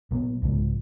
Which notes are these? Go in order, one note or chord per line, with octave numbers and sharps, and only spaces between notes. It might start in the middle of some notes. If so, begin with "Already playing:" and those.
A#2 F#3 B3
C2 G#2 C#3 F3